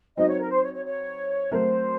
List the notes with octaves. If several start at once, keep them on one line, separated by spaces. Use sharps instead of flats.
F#3 C4 D#4 F#4 D#5
C#5
A#4
C5
C#5
C#5
C#5
F#3 A3 C4 F#4 A#4 C5